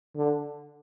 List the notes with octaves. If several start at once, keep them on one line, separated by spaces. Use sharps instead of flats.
D3